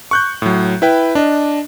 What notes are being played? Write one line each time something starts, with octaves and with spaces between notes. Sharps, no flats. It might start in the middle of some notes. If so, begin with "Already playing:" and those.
C#6 F#6 G6
A2 F#3
E4 B4 G5
D4 D#5